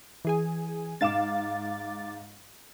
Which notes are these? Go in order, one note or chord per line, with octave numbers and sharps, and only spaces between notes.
E3 G#4 G#5
G#2 F5 D6 A6 E7